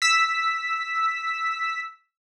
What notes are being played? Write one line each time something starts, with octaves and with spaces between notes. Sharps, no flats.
E6 B6